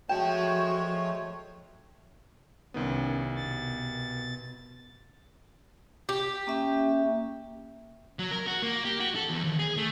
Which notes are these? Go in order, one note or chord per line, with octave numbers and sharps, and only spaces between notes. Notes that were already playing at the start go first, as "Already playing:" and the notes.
F3 G#3 A3 F#4 C#5 G5 A5
C2 D#3 B3 C#4
B2 A6
G4
A#3 C#4 E5
F#3
A#4
F#4
A#3
G4
F#4
A4
E2
D#2
G#4
A3